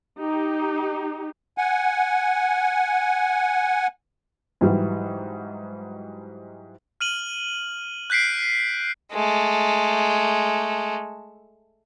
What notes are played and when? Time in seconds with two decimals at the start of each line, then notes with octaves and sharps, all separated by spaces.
0.20 D#4 G4
1.58 F#5 G#5
4.61 G#2 E3 F#3 G3
7.01 F6 D#7 F#7 G7
8.10 F#6 G6 B6 C7 D7
9.13 G#3 A3